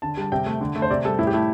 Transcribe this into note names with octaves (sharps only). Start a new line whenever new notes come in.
D3 A5
G3 A5
C3 G5
A3
D3
A3
C5
C3 D5
G3 A4
A2 E4
G4
A3 E4